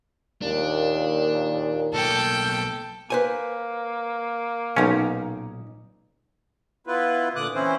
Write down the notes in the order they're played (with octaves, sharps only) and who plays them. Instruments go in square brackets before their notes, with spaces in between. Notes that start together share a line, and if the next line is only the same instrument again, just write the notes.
[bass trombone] D#2 [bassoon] A#2 [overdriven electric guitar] D4
[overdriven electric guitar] B1 A#3 [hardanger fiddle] A4 G5
[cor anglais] A#3 [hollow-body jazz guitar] B4 C5 G#5
[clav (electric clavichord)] B1 C#4 [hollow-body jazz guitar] A#2 D#4
[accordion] B3 E4 F4 B4
A#2 D3 D6 D#6 F#6
E3 C4 C#4 E4 C5